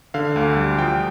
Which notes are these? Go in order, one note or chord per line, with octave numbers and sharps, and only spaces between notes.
D3 F5
D2
G3
F3 G5